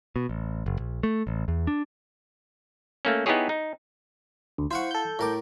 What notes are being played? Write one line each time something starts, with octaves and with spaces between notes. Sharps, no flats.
B2
A1
F#1
A#1
A3
A1
E2
D4
A3 A#3 C#4
B3 D#4 E4 G4 G#4 C#5
D#4
D2
E4 C5 F5 F#5 C#6
A4 G6
A2 A#4 D6